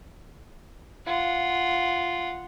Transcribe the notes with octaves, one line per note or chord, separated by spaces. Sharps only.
F4 F#5